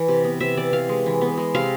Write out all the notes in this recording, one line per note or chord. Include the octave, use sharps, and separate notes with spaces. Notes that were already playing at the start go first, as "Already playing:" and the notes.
Already playing: E3
C3
B3
C3 E5
E3 D5
E3 F5
G#3
E3
B3
G#3
C3 F5